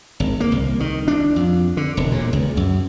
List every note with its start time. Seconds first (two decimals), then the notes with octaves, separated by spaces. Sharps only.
0.20 G#1
0.40 A#3
0.52 C2
0.80 D#3
1.08 D4
1.36 F2
1.77 D3
1.97 E1
2.12 A#2
2.33 C#2
2.57 F#2